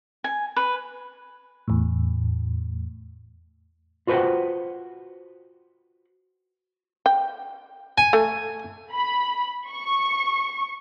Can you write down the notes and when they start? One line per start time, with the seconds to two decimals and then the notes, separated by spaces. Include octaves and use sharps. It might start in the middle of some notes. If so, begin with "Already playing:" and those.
0.24 G#5
0.56 B4
1.68 E2 A2
4.07 F4 F#4 B4 C5 F#5 G5
7.06 G5
7.98 G#5
8.13 A3
8.94 B5
9.70 C#6